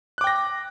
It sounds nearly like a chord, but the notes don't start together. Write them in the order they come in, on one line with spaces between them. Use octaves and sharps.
F#6 D6 G5 A#6